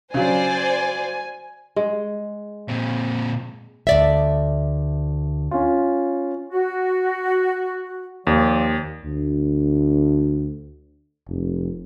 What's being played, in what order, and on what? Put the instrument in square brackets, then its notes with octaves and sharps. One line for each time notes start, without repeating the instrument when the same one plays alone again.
[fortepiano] C#3 F#3 [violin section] C5 D5 [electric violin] G#5
[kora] G#3
[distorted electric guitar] A#2 C4
[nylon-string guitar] D2 D5 E5
[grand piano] C#4 F4
[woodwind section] F#4
[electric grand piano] D#2 [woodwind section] F3 D5
[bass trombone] D2
F1